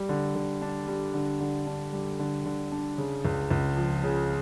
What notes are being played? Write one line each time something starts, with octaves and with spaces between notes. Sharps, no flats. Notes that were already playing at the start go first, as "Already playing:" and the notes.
Already playing: G3
D3
D3
D4
G3
D3
D3
D4
G3
D3
D3
D4
C#3
C#2
C#2
F3
C#3